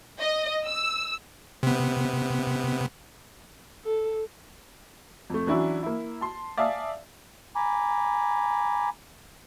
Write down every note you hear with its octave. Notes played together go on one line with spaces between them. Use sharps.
D#5
E6
C3 B3
A4
F2 A3
E3 F#3 C#4 D4 E4 F#4
A#3 E4
A5 C6
D5 E5 F5 G#5 A5 D#6
G#5 A#5 B5 D6